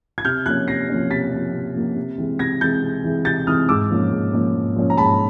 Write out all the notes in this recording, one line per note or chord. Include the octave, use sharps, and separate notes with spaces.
G#6
C3 F6 G6
F3 A#3 C#4 F#6 G#6
C3 A#6 C7
F3 A#3 C#4
C3 A6 B6
F3 A#3 C#4
C3
F3 A#3 C#4
C3
E3 G#3 C4
C3 G#6 A#6
E3 G#3 C4 G6 A6
C3
E3 G#3 C4
C3 G6 A6
E3 G#3 C4 D#6 F6
G#2 D6 E6
F3 A#3 C#4
G#2
F3 A#3 C#4
G#2
F3 A#3 C#4
A#5
G#2 A5 B5